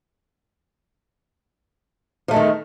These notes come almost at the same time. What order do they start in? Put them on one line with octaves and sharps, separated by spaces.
F3 A3 G#3 D#3